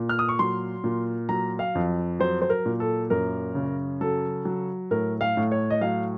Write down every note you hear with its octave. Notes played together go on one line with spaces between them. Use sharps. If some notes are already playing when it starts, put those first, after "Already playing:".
Already playing: A#2
F6
D#6
C#6
F#3 C6
A#2
F#3 A#5
F5
F2
F#3 C5
C5
A#4
A#2
A4
F#2 A#4
C#3
F#3 A4
F#3
A2 A#4
F5
A2
C#5
D#5
F#3 F5